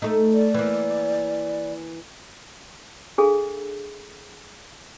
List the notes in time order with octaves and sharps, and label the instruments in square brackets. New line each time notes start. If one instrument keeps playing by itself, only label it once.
[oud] A3 D#4
[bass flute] D5
[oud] E3 A#3
[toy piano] D4 G#4 A4 F5